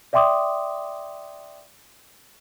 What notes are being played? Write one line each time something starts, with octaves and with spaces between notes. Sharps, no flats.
D5 E5 G5 C6 D6 D#6